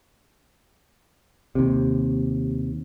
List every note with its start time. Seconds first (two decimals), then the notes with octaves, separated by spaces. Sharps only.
1.55 D#2 C3